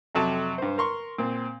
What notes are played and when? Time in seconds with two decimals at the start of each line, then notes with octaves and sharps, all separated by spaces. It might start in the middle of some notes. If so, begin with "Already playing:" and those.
0.15 F2 C3 F#3 A4 A5
0.58 G2 C5
0.78 A#4 C6 C#6
1.18 A#2 C4